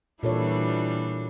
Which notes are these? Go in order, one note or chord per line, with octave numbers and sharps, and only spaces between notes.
A#2 E3 G3 D4 A4 C#5